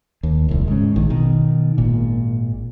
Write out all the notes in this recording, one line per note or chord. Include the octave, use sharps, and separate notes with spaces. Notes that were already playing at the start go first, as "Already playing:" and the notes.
D#2
D1 C2
G#2 C#3
A#1 D#3
B2 D#3
G#1 A#2